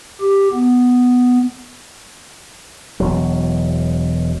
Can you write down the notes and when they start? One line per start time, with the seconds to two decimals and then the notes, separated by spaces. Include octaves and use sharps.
0.22 G4
0.54 B3
3.00 E1 F#3